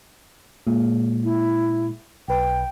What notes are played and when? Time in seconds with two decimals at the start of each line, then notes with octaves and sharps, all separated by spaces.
0.67 A#2 G#3
1.24 E4
2.28 B1 B4 G5